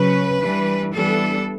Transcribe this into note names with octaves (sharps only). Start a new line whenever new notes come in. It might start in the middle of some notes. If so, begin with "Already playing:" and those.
Already playing: C#3 F#3 C#4 B4
E3 G3 D4
E3 G3 B3 D4 A4